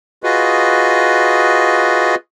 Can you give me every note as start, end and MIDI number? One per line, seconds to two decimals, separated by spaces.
0.24 2.15 65
0.24 2.15 66
0.24 2.15 68
0.24 2.15 71
0.24 2.15 75